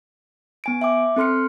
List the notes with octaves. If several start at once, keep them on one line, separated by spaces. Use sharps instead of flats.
B3 G#5 D7
E5 G5 D6
C4 A4 C6 F6 C#7